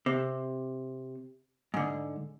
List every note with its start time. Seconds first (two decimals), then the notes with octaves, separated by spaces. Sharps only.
0.06 C3
1.74 G#2 D3